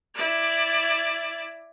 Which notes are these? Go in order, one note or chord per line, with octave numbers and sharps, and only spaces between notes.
E4 D5